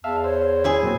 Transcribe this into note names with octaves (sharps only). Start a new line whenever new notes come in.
E2 E5 F5 A5
C5 C#5
E4 G#4 G#5
A#2 F#3 C4